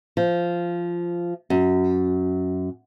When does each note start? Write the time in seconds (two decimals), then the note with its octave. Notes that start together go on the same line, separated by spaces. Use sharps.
0.17 F3
1.50 F#2